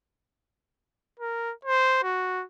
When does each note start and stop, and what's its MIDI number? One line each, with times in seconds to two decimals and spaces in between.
1.20 1.52 70
1.65 1.99 72
2.03 2.44 66